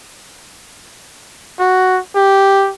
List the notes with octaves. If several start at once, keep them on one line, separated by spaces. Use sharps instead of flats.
F#4
G4